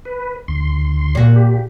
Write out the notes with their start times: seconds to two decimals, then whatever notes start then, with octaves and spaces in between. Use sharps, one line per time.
0.05 B4
0.48 D2 C6
1.15 A#2 F#4
1.36 G4